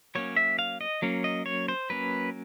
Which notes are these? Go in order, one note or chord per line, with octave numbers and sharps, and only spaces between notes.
F#3 A#3 C#4 C#5
E5
F5
D#5
F#3 A#3 C#4
D#5
C#5
C5
F#3 A#3 C#4 B4